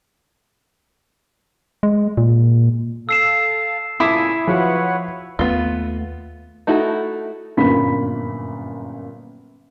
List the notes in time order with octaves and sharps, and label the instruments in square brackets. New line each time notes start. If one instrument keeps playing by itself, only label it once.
[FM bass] G#3
A#2
[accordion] A4 F5 [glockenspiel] E6 C7 E7
[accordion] A#2 C#3 G#5 [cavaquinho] E4 [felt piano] A5 D6 D#6
[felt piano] F3 F#4 [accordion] B4 C#5 F#5
[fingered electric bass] D#2 A3 [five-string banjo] B3 F4
[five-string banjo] A3 D#4 E4 F#4 A4
[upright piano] G1 F#2 A#2 A#3 B5 B6